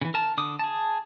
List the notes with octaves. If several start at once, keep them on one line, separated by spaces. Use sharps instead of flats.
C#3 E3
A#4 A5
D3 D6 D#6
G#4 A5